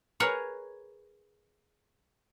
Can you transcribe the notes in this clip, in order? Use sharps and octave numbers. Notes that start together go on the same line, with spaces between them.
G#4 A#4 B4 C#5 F#5 G#5